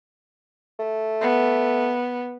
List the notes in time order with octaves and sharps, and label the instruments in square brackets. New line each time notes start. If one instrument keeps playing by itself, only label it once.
[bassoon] A3
[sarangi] B3